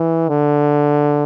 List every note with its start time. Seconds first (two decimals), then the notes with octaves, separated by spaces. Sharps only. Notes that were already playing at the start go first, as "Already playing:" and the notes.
Already playing: E3
0.29 D3